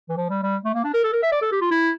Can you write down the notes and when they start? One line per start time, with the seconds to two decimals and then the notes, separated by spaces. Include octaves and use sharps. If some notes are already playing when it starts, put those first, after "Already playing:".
0.09 E3
0.17 F3
0.30 G3
0.43 G3
0.65 A3
0.74 A#3
0.84 D4
0.94 A#4
1.04 A4
1.13 A#4
1.23 E5
1.32 D5
1.42 A4
1.52 G4
1.61 F4
1.71 E4